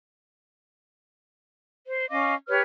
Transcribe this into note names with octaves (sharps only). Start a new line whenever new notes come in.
C5
C#4 D#5 F5 D6
G4 B4 C#5 F6